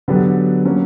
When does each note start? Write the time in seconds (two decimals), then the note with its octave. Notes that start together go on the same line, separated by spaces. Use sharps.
0.08 D3 F#3 B3 D4 G4
0.65 F#3 A#3 C#4